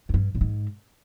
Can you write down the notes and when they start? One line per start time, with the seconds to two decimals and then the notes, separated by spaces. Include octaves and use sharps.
0.09 F2
0.14 G2
0.35 A#2
0.41 G#2